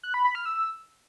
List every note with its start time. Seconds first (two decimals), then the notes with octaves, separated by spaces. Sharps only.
0.03 F#6
0.14 B5
0.24 B5
0.35 F6
0.46 E6